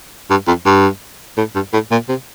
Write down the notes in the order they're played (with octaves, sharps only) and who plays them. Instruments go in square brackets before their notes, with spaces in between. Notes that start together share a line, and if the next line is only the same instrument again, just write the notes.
[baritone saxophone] G2
F2
G2
A2
G2
A2
A#2
C3